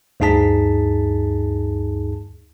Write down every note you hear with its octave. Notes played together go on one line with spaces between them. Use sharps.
D2 G2 D#4 G#4 A5 B6